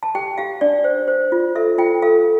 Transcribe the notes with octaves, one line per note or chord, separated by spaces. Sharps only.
A5
G4 G5
G4 F5
D4 D5
C5
C5
F4
A4 E5
F4 G5
A4 F5